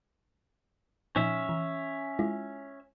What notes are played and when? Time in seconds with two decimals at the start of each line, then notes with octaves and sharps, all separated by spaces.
1.16 A#2 F3 C#4 D#4 E5
1.49 E3
2.19 G#3 E4 F4